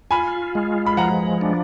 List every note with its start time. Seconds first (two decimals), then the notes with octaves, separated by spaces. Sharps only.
0.11 F4 G#5 B5
0.55 G#3
0.86 B5
0.97 F3 F#5 A#5
1.41 D4